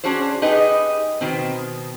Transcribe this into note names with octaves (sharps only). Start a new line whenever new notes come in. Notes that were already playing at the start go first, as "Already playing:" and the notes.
C#4 D4 F#4 G#4 C5
D#4 G4 G#4 B4 D#5
B2 D#3 C4